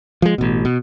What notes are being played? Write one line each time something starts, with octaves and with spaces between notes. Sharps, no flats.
F3 G#3
A1 B2
B2